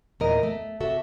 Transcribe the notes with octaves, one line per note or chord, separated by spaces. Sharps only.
E2 A#2 A#4 D#5
A3
C3 F#4 A4 E5